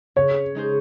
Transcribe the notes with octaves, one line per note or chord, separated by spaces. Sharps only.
C#3 C#5
G#3 D#4 G#4 C5